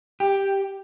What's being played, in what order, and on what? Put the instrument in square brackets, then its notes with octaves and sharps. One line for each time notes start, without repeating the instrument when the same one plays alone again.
[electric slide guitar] G4